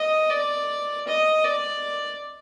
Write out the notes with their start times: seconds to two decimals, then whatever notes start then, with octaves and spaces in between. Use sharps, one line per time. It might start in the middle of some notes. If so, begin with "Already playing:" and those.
Already playing: D#5
0.31 D5
1.08 D#5
1.44 D5